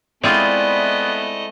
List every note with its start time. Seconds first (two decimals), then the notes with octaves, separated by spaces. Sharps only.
0.23 G#3 A3 B3 C4 E4 F4 D5 D#5